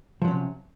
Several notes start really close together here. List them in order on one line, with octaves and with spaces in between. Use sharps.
F3 F#3 C#4 C3